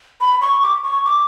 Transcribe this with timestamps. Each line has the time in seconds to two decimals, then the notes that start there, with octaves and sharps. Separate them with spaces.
0.21 B5
0.42 C#6
0.62 D6
0.83 C#6
1.05 D6